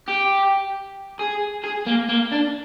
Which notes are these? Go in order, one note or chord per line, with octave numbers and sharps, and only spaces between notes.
G4
G#4
G#4
A#3
A#3
D4